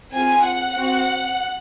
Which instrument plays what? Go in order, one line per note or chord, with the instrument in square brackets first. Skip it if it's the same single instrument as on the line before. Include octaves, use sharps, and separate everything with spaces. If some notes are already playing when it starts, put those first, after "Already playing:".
[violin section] C4 F4 G#4 G#5
F#5
C4 F#4